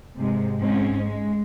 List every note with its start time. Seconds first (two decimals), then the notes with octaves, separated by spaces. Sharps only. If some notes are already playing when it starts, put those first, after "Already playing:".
0.18 G#2 C3 G#3
0.59 G#2 C4 C#4
1.02 G#3